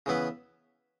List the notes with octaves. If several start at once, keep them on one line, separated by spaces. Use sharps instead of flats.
C#3 E3 B3 E4 B4